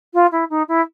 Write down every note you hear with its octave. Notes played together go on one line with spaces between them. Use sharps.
F4
E4
D#4
E4